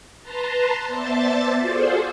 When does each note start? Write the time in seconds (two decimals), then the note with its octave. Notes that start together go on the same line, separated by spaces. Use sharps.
0.22 B4 A5 A#5 C6
0.87 B3 C5 D5 E5 A5 A6
1.59 F4 F#4 G#4 A4 C5 D5